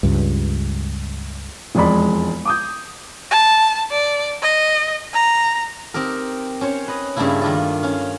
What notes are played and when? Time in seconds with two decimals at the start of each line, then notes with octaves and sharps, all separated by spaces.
0.03 C#2 G2
1.75 E1 F2 G#3 D5 B5
2.45 D6 D#6 G6
3.31 A5
3.91 D5
4.42 D#5
5.13 A#5
5.94 C4 D#4 G4 A#4
6.61 C#4 C5 C#5
6.88 B4 D#5
7.16 G2 C#3 G3 A3 A#3 E4
7.42 D#3 D4 F4
7.83 C#4 F5